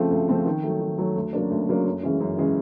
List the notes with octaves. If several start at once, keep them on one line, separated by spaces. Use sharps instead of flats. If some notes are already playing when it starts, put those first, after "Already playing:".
Already playing: C#3 F3 A3 C4
D2
C#3 F3 A3 C4
D#3
F#3 A3
D#3
F#3 A3
D2
C#3 F#3 A#3 D4
D2
C#3 F#3 A#3 D4
F#2
C#3 E3 G#3 C#4
F#2
C#3 E3 G#3 C#4